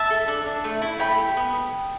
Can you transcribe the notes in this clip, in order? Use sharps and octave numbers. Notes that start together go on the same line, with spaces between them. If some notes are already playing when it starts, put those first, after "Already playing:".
Already playing: E5 A5
A4
D4
D4
A3
E4
A3 G5 B5
G4
B3